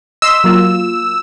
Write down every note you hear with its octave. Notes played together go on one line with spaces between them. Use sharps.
D#5 C6 E6 B6
F#3 A#3 F4